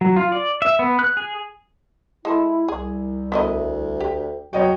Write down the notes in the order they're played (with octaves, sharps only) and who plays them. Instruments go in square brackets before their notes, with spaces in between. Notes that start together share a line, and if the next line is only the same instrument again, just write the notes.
[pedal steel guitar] F#3
F4
D5
E5
B3
F#6
G#4
[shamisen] G#3 A4 [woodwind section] E4
[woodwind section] C2 [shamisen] G#4
[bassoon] D2 [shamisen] B3 E4 D#5
[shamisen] G4
[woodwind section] E2 B2 F#3 [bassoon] F#4 [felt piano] C#5 D#5 G5